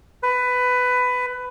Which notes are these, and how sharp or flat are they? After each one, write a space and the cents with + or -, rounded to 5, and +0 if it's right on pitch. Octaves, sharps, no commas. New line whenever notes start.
B4 +15